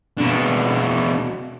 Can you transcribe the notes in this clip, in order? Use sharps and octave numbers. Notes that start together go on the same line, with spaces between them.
B2 D4